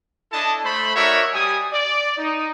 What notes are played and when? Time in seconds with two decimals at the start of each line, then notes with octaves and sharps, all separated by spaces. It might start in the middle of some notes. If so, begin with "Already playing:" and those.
0.32 D4 E4 A4 D#5 A5
0.64 A3 C5 B5
0.95 D#4 F#4 A#4 C#5 D5 E5
1.33 G3 G#5 D#6
1.72 D5
2.18 D#4